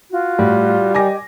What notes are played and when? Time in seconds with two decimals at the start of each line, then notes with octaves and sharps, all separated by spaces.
0.11 F4 F#4
0.39 A2 G3
0.94 G4 D#5 G#5 D6 A#6